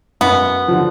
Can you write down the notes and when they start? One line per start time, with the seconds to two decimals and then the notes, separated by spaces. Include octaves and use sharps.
0.21 F#2 B3
0.68 D3 F3